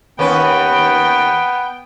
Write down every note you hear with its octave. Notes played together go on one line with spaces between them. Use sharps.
D#2 B3 C#4 B4 G5